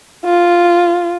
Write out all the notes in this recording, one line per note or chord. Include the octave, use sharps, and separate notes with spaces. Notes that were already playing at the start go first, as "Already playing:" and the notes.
F4